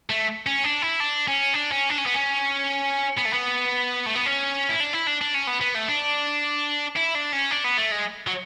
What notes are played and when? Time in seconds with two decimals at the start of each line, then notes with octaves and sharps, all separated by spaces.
0.10 A3
0.46 C#4
0.64 D4
0.82 E4
1.00 D4
1.28 C#4
1.54 D4
1.72 C#4
1.90 D4
1.98 C#4
2.06 B3
2.14 C#4
3.17 B3
3.25 A3
3.33 B3
4.06 A3
4.15 B3
4.26 C#4
4.69 E4
4.80 D4
4.93 E4
5.07 D4
5.21 D4
5.34 C#4
5.47 B3
5.61 B3
5.75 A3
5.89 D4
6.96 E4
7.15 D4
7.32 C#4
7.51 D4
7.64 B3
7.77 A3
7.91 G#3
8.27 F#3